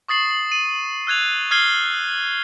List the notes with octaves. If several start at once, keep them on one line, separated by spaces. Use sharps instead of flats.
C#6 D#6 A6 C7 F#7
D#7
E6 F#6 G#6 F7
D#6 F6 G#6 C7 G7